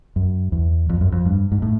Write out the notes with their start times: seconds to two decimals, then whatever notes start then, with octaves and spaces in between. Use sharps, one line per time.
0.16 F#2
0.52 E2
0.90 F2
1.01 F#2
1.12 F2
1.26 G2
1.52 G#2
1.62 A2